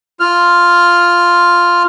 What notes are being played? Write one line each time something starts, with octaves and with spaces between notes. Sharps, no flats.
F4 F6